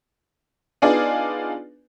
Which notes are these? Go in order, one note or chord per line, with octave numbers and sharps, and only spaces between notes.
B3 D4 D#4 F4 G#4 D5